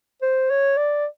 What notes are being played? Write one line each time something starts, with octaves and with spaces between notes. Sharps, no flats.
C5
C#5
D5